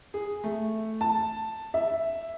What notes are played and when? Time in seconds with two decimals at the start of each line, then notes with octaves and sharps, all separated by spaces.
0.14 G#4
0.44 A3
1.01 A5
1.74 E5